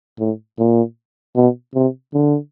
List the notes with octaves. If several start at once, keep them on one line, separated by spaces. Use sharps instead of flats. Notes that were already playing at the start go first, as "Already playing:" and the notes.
A2
A#2
B2
C3
D3